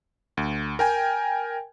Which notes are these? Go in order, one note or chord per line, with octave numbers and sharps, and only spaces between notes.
D2
A#4 G5 G#5